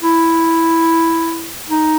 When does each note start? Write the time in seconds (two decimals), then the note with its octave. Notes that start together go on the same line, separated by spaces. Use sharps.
0.03 E4
1.70 D#4